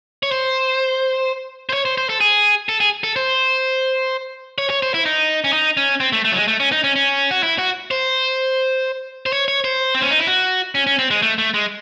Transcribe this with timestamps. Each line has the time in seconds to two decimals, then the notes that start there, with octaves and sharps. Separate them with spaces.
0.23 C#5
0.32 C5
1.69 C5
1.73 C#5
1.85 C5
1.98 C5
2.09 A4
2.21 G#4
2.69 A4
2.80 G#4
3.04 A4
3.16 C5
4.58 C#5
4.70 C#5
4.82 C5
4.94 E4
5.05 D#4
5.44 C#4
5.53 D#4
5.77 C#4
6.00 C4
6.13 A3
6.25 A3
6.32 F#3
6.36 G#3
6.48 A3
6.60 C#4
6.72 D#4
6.84 C#4
6.96 C#4
7.31 F#4
7.43 E4
7.58 F#4
7.91 C5
9.26 C5
9.33 C#5
9.48 C#5
9.64 C5
9.95 C4
10.02 C#4
10.11 D#4
10.19 E4
10.27 F#4
10.75 C#4
10.87 C#4
10.99 C4
11.11 G#3
11.22 A3
11.38 A3
11.54 G#3